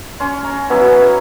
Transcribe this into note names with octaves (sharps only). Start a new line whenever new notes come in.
C#4 C6
A#5
F#3 B3 C#4 E4